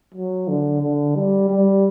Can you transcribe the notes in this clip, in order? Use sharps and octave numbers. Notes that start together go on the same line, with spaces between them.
F#3
D3
D3
G3
G3